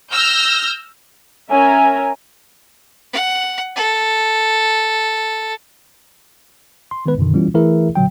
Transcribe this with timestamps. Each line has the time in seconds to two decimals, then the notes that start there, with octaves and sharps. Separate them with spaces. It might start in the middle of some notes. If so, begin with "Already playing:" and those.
0.12 E6 F6 G6 A#6
1.49 C#4 A#4 E5 G#5 A#5
3.13 F#5
3.76 A4
6.91 C6
7.06 D#3 G#3 B3 B4
7.18 F#2 B2 D3 D#3
7.34 E3 G3 B3 C#4 E4 F4
7.54 E3 A3 E4 G#4 A#4 E5
7.95 A#2 D3 F#3 G5